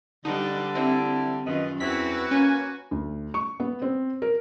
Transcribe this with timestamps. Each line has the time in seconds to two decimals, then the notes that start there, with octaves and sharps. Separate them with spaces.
0.25 D3 G3 D#4 B4
0.75 G3 C4 E4
1.46 F#2 B2 D#3 F4 B4 D#5
1.80 E2 F#3 C4 E4 F#4 B4 B6
2.31 A#3 C#4 G#5
2.91 D2
3.34 C#6
3.60 B3
3.82 C4
4.22 A#4